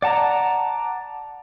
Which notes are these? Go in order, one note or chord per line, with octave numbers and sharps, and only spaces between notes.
D5 F#5 A5 A#5